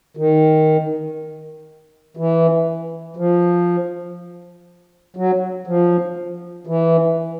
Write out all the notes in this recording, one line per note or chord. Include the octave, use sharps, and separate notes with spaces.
D#3
E3
F3
F#3
F3
E3